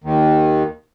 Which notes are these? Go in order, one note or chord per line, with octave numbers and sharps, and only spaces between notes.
D#2 D#3